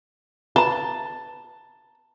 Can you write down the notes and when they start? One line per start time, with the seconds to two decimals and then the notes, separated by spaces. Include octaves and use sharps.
0.56 B4 A5 A#5